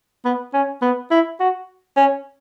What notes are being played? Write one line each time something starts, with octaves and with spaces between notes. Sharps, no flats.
B3
C#4
B3
E4
F#4
C#4